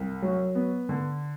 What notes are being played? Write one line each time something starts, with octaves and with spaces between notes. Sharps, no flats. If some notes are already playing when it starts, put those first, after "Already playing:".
Already playing: C2
F#3
B3
D3